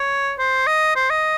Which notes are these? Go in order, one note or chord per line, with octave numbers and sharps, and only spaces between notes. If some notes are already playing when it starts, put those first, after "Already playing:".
Already playing: C#5
C5
D#5
C5
D#5